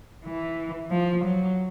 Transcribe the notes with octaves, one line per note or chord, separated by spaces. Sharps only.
E3
F3
F#3